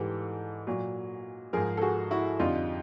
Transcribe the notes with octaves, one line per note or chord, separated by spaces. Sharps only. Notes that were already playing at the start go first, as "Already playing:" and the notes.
Already playing: G#2 E3 G3 G4 A4
A#2 F#3
G#2 F3 G#4 A#4
A4
F#4 G#4
E4 F#4
F2 D3 G3 D#4 F4